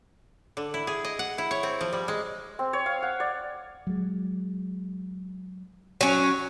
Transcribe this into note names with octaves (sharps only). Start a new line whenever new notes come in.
D3
E4
G#4
D#5
F#5
E4
C#5
C4
F3
G3
G#3
C4
C#5
F5
F#5
D5
F#3 G#3
F#3 C#4